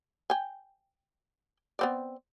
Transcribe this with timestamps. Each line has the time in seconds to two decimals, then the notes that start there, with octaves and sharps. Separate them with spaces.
0.30 G5 G#5
1.79 B3 C4 D5